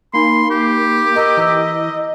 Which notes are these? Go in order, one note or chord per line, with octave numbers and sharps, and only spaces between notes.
A#3 D#4 B5 C6
G4
A#4 D#5 A#5 E6
E3 A#5 E6